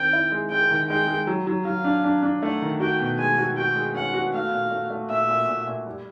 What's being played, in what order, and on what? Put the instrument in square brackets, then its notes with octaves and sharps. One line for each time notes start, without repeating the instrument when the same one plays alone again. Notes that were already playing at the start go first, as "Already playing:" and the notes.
Already playing: [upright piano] D#3 C4 [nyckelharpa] G5
[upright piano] E4
G#3
[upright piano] G#3 [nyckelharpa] G5
[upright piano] D#3
[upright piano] G#3 [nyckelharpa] G5
[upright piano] G#3
F#3
F#3
[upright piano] F#3 [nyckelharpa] F5
[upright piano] D4
D4
D4
[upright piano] A3 [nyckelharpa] F#5
[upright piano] D#3
[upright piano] F#4 [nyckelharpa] G5
[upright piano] B2
[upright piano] G#3 [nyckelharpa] G#5
[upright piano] F#4
[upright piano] F#4 [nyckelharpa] G5
[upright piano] G#3
[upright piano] C#4 [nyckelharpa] F#5
[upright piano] F#4
[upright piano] A3 [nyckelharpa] F5
[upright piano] A#2
A3
A3
[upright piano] A#2 [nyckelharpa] E5
[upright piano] A#2
A#2
A#2
G3